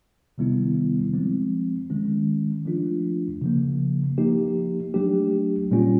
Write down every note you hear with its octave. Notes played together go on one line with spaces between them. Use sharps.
C3 D#3 G3 B3 E4
F3 G#3 C4
D#3 G#3 C#4
F3 A3 D4 F4
C#3 F3 A#3
F3 A#3 D#4 G4
F#3 A3 D4 G4
A#2 G3 A#3 C#4 F4